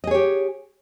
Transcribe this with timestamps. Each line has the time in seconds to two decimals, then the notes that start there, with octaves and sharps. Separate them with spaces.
0.04 D#5
0.07 G#4
0.11 C#5
0.15 G4